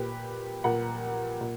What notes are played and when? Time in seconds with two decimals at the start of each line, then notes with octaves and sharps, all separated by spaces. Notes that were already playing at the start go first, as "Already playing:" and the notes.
Already playing: A#2 G4 B4
0.64 A#2 F#5 A#5
1.41 A#2